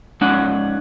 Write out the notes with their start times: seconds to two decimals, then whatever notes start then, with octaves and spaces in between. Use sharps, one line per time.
0.21 G#2 C#4 F#5